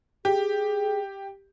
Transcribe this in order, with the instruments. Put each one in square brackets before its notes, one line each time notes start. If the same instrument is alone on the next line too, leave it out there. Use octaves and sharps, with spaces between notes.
[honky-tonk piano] G4 [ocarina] G#4